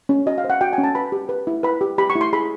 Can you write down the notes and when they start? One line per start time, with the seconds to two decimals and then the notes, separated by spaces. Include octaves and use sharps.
0.09 C#4
0.26 F#4 D#5
0.38 F5
0.44 C5
0.50 F#5
0.61 F#4 G5
0.73 G#5
0.78 C#4
0.84 A5
0.95 B4 B5
1.12 G4
1.29 B4
1.47 E4
1.63 B4 B5
1.81 G4
1.98 G4 B5
2.10 C#6
2.15 E4
2.21 C6
2.33 G#4 B5